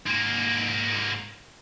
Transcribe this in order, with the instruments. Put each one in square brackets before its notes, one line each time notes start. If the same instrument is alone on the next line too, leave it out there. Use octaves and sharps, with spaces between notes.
[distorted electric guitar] G#2 A#3